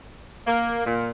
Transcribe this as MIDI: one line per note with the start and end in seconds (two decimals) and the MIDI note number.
0.47 0.83 58
0.85 1.10 46